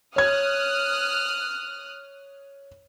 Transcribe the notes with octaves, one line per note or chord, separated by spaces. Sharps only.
C#5 D#6 F6 F#6 G#6